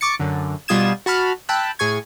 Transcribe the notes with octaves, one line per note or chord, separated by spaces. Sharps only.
C#6 D6 A6 C#7
F#2 D3
B2 G3 F4 D#6 G#6 E7
F#4 A5 B5 F6
G5 A5 B5 E6 F#6
A2 G#4 G#5 C#6 G#6